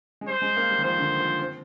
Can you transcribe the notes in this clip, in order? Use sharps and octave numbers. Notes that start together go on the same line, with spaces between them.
G#3
G3 C5
G#3
A#3
G3
D#3
F3 C5
D3
D#3
F3
C4